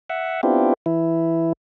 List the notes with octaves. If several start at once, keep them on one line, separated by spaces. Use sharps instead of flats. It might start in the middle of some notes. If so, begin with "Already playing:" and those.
E5 F#5
B3 C4 D4 E4 F4 G4
E3 E4